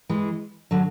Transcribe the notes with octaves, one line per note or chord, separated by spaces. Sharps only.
E3 G#3
D3 F#3